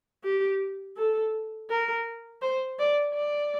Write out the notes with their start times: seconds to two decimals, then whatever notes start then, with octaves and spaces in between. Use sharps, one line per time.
0.24 G4
0.97 A4
1.70 A#4
2.42 C5
2.79 D5
3.15 D5